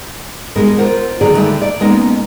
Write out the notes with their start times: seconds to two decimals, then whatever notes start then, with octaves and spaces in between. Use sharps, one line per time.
0.56 B2 G3 G#3 D#4 A#4
0.77 F4 A#4 C5 F#5
1.21 B2 D3 D#3 F#3 G#4 D5
1.36 D3 G3 A3 D#4
1.62 D5
1.80 B2 G#3 A#3 B3 C#4 D#4